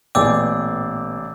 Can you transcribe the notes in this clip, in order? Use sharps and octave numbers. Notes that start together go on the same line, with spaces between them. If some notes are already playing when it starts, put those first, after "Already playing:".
A1 A#2 B3 G#4 D5 G5 D6 E6